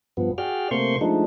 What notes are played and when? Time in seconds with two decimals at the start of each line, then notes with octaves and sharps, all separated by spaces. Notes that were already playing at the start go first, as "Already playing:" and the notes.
0.17 G2 F3 B3
0.38 F#4 G#4 D5 G5 F6
0.71 C3 A3 A#3 C5 C6 C#6
1.01 F3 G#3 A3 D4 D#4